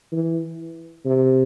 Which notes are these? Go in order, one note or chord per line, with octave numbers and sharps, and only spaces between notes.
E3
C3